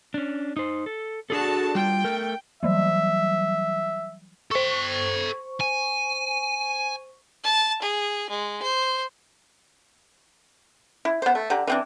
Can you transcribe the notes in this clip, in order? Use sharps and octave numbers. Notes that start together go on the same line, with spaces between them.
C#4 D4
D#4 C5
A4
D3 D4 F#4 G#4 A4 A5
G3 F4 G5
A3 A#4
E3 F#3 G3 E5
A4 C5 G5 C#6
G#5
A5
G#4
G#3
C5
E4
B3 C5
A3
D3 G4 A#5
E3 C4 D4